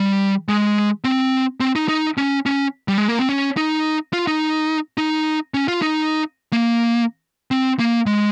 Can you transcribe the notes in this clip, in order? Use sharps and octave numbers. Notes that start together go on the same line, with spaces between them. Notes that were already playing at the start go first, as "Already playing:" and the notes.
Already playing: G3
G#3
C4
C4
D#4
D#4
C#4
C#4
G3
G#3
A#3
C4
C#4
D#4
F4
D#4
D#4
C#4
F4
D#4
A#3
C4
A#3
G#3